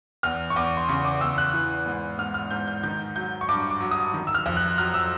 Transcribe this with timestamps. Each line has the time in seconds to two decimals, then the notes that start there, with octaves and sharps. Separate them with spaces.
0.23 E2 F6
0.50 C#6
0.56 E2 D6
0.77 C6
0.89 C#3 C#6
1.05 D6
1.21 E2 E6
1.38 F#6
1.53 E3
1.86 G#2
2.18 G#2 F6
2.34 F6
2.51 G#2 G6
2.67 G6
2.83 D#3 G6
3.16 F#3 G6
3.41 C#6
3.49 G2 D6
3.70 D6
3.81 F#3
3.91 D#6
4.14 D#3
4.27 E6
4.35 F6
4.46 F2
4.57 F#6
4.78 F#3 F6
4.94 E6